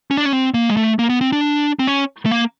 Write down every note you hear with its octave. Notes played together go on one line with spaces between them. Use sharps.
C#4
D4
C#4
C4
A#3
G#3
A3
A#3
B3
C4
D4
C4
C#4
A3
A#3